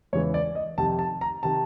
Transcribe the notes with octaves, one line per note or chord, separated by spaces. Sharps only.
E2 C#3 E3 G#3 C#5
D5
D#5
F2 C3 D#3 A5
A5
A#5
C3 D#3 A5